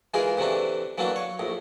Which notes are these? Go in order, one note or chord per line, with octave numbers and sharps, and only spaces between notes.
E3 G#3 F4 G#4 A#4
A2 C3 E3 A3 D4
E3 F#3 A3 A#3 D4
C#5
A#1 A2